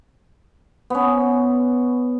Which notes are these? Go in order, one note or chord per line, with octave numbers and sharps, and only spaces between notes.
B3 C#4